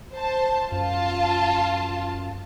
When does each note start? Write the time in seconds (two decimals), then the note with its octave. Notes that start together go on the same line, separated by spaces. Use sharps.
0.13 C5 A5
0.72 F#2 F4 A5